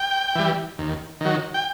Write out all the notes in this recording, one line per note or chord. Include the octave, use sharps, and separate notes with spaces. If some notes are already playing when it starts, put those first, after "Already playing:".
Already playing: G5
E3 G3
D#2
D#3 F#3
G5